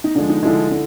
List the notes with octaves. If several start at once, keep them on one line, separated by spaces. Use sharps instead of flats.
D#4
D3 F3 G#3 D4
D#4
D3 F3 G#3 E4
D3